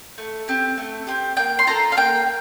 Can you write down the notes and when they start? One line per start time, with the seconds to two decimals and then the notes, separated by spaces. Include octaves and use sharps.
0.18 A3
0.48 C4 G4
0.77 A3
1.07 C4 G4
1.37 A#3 G5
1.59 C6
1.67 F4 A4 A#5
1.92 F5
1.97 A#3 G5